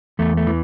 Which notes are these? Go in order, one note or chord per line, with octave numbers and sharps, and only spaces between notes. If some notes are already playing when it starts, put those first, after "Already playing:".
E2 A3
A3
E3